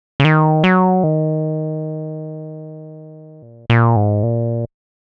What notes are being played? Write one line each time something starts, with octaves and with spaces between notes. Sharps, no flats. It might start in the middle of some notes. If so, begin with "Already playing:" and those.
C#3
D#3
F#3
D#3
A#2
A#2
G#2
A#2